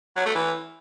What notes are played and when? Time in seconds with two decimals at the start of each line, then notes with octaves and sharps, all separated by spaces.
0.16 F#3
0.26 A3
0.35 E3